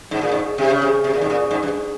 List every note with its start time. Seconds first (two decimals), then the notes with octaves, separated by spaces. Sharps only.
0.11 G#2
0.21 A#2
0.32 G#2
0.58 C3
0.70 C#3
0.82 C3
1.04 C3
1.13 A#2
1.21 G#2
1.30 A#2
1.51 G#2
1.63 G2